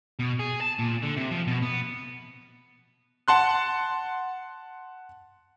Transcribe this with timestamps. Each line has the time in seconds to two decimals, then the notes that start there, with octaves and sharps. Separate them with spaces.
0.19 B2
0.39 G#4
0.61 A5
0.79 A#2
1.03 D3
1.17 C3
1.31 F3
1.47 B2
1.62 B3
3.28 F#5 A5 C6 F#6